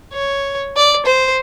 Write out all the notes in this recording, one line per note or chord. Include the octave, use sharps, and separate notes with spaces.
C#5
D5
C5